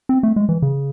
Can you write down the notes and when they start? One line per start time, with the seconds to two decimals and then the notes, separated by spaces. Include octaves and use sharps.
0.09 C4
0.23 A3
0.36 G#3
0.49 E3
0.62 C#3